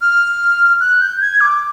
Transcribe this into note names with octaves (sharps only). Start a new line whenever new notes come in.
F6
F#6
G6
G#6
D6